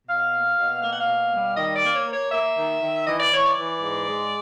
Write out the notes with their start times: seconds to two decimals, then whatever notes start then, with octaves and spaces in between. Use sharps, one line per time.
0.08 B2 F5
0.33 A#3
0.58 B2
0.82 A#3 F5
0.91 F#5
1.00 F5
1.07 B2
1.32 G3
1.57 D#3 D#5
1.75 D5
1.82 A#3
1.95 C#5
2.07 A#3
2.13 C#5
2.32 A#3 E5
2.57 D#3
2.81 D#3
3.06 E3 D#5
3.20 D5
3.32 E3 C#5
3.46 D5
3.57 E3
3.81 G#2
4.07 G#3